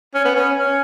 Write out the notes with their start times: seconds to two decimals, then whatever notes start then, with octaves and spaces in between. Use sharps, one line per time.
0.14 C#4
0.25 B3
0.35 C#4
0.59 C#4